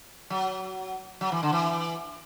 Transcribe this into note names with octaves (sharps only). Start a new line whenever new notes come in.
F#3
F#3
E3
D3
E3